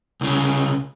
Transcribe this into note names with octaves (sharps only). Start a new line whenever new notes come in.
C2 C#3